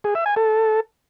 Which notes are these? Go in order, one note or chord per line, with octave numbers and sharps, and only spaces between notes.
G#4
E5
G#5
A4